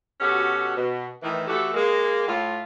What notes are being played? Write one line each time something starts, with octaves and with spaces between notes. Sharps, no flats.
B2 C#4 F#4 G4 A4
B2
A2 D#3 E3
E3 A3 F#4 G4 A4
G#3 A#3
A2 F4